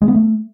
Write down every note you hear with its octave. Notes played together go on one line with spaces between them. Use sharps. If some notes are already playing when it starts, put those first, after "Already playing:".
G#3
B3
A3